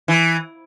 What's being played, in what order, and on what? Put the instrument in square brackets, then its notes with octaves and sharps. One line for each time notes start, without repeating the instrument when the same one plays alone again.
[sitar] E3